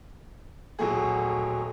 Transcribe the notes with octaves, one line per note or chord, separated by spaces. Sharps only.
D#1 B2 F#3 A3 G#4